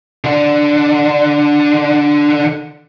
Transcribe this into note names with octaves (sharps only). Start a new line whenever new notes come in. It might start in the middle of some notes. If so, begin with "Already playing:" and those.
D3 D4